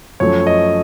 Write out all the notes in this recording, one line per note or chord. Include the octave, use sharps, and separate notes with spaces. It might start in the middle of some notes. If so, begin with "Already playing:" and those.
F#2 F3 A3 C#5
D#5